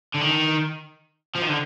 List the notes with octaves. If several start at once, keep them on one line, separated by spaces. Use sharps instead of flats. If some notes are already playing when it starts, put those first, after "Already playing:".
D3
D#3
F3
D#3
D3